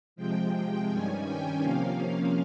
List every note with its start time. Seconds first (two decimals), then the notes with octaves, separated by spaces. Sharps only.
0.16 C3 F3 G#3 G5
0.88 G2 D#3 G3 C#4 G#5
1.25 G5
1.61 C3 F3 A#3 C#4 F5